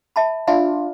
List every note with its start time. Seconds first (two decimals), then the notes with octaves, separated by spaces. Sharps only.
0.16 E5 A5 B5
0.48 D4 F4 E5 G#5 B5